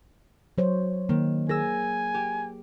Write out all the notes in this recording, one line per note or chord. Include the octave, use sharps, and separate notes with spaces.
F#3 C5 C#5
D#3 A#3
G#4 A#4 G#5 E6 A#6
G4